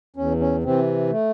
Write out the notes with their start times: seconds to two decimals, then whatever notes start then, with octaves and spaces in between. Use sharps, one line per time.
0.16 E2 C#4
0.40 C#4
0.63 C3 E3 C4
1.10 A3